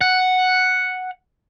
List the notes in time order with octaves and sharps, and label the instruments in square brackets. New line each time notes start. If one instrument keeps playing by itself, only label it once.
[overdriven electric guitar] F#5